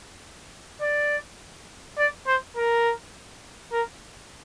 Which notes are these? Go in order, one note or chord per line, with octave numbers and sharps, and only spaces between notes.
D5
D5
C5
A#4
A#4